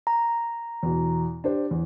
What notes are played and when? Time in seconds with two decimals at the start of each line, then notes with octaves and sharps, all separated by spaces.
0.07 A#5
0.83 E2 B2
1.44 D4 G4 C5
1.71 E2